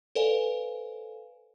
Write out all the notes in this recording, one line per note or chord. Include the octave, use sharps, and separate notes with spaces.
A4 B4 C5 D5 F5 G#5